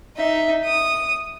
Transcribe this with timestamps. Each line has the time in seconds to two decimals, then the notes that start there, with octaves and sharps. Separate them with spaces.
0.17 D#4 E5
0.65 D#6